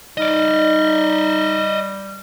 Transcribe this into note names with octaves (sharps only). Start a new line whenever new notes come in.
G3 D#4 D5 D#5